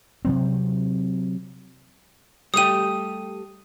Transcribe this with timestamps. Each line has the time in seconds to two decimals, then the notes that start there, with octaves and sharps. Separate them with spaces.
0.25 C3 F#3 C4
2.54 G3 A3 G4 D#6 D#7